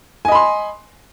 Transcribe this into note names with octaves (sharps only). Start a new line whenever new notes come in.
D#5 G#5 B5 C6